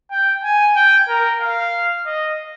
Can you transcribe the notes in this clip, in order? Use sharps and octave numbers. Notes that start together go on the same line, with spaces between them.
G5
G#5
G5
A#4
F5
D#5